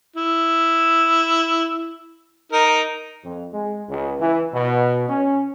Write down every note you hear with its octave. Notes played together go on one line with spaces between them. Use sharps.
E4
D#4 A#4
F2
G#3
C#2
E3
B2
C#4